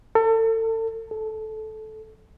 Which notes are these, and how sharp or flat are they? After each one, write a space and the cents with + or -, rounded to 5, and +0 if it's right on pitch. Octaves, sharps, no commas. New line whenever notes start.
A4 +35
A4 -15